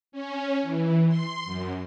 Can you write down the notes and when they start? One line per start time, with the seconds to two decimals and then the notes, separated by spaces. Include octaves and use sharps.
0.12 C#4
0.63 E3
1.07 C6
1.45 F#2